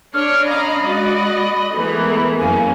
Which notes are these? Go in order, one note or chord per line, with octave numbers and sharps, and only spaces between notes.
D4 C#5 F6
C#4 D#5 F5 A#5 B5
G#3 F#4 D5
E3 G#3 A3 B3 E4 A#4
F#2 A#3 C#4 G#5